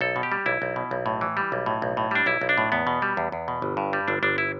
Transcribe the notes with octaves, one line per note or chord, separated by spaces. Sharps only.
B1 A4
B2
G4
G3
B1 E4
B1
B2
B1
A2
E3
G3
B1
A2
B1
A2
G3 D4
B1 E4
B1
D4
A2
E2 B3
B2
G3
E2
E2
B2
G1
G2
G3
G1 D4
G1 D4
E4